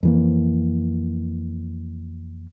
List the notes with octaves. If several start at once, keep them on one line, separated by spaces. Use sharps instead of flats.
F2 E3 A#3